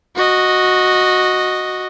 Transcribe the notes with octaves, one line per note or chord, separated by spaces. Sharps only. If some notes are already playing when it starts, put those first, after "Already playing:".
F#4 D#5